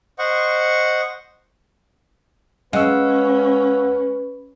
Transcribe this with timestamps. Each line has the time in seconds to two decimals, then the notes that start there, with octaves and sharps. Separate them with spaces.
0.19 C5 D#5 F#5 C#6
2.73 G#3 C#4 B4 F5 F#5 E6